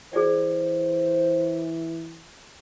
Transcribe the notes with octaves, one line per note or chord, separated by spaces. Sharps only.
E3 G#4 C5 D5